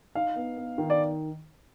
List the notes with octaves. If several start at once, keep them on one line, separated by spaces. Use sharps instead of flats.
D#4 F5
B3
B3
D#3
D5